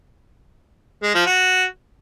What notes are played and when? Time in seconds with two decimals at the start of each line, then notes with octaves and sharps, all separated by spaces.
1.03 G#3
1.15 F3
1.26 F#4